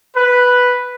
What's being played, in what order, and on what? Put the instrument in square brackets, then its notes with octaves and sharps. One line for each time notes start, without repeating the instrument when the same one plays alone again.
[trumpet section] B4